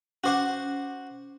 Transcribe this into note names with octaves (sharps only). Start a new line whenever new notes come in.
C#4 F#4 C5 F#5 D6